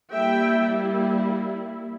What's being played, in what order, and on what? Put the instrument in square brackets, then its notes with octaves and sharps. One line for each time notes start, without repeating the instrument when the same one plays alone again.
[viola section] G3 A#3 E4 E5 G5